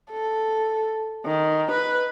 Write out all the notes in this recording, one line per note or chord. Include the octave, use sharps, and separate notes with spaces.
A4
D#3
B4